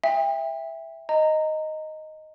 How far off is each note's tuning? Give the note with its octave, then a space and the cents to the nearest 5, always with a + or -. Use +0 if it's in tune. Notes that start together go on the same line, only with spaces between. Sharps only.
E5 +0 G5 +35
D#5 +0 A#5 -20